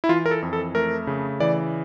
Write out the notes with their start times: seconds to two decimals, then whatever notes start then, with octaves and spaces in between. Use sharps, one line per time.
0.04 E4
0.09 E3 F4
0.26 A#4
0.31 A4
0.42 F2
0.53 A4
0.75 A3 A#4
1.07 C#3
1.40 E3 D5